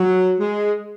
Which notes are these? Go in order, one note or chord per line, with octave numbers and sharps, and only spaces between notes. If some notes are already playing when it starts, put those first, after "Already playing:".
Already playing: F#3
G#3